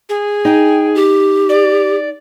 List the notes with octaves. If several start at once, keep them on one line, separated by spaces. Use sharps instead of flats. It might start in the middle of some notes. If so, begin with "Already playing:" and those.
G#4
D#4 G5
G4
D5